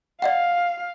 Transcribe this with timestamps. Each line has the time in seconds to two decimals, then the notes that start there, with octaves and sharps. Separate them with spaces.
0.22 D5 D#5 F5 F#5